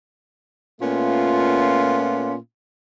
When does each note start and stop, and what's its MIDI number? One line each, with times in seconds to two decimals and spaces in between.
0.81 2.35 46
0.81 2.35 57
0.81 2.35 59
0.81 2.35 61
0.81 2.35 65